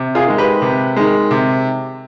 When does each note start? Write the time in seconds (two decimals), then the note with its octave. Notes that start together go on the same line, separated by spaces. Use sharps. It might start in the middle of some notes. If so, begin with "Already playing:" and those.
Already playing: C3
0.15 F4 G#4
0.27 D#3 G#3
0.38 G4 B4
0.62 C3
0.96 D#3 G#3
1.31 C3